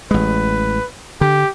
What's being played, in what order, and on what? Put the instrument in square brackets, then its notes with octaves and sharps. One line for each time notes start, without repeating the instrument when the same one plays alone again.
[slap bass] A1 G#3 [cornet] B4
[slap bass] D3 [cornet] G4